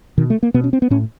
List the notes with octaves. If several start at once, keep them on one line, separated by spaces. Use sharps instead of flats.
B2 D#3
A3
A#3
B2 B3
C#4
C4
B3
A2 C#4